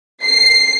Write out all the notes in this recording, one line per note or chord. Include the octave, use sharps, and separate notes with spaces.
C7